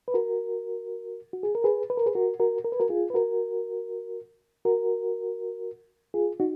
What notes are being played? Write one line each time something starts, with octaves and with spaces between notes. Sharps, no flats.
B4
F#4 A#4
F#4
G#4
A#4
G#4 B4
B4
A#4
G#4 B4
F#4 A#4
F#4 A#4
A#4
B4
F#4 A#4
F4 G#4
B4
F#4 A#4
F#4 A#4
F4 G#4
D#4 F#4